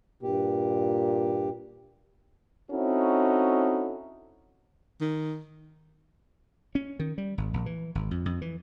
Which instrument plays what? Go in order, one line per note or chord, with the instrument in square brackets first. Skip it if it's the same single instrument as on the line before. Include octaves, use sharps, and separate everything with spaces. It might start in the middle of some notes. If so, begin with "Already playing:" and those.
[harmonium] G2 G4 [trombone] A#2
[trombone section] C4 C#4 D#4 E4 F#4 A4
[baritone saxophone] D#3
[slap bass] C#4
D#3
G3
G#1
A#1
E3
G#1
F2
F2
E3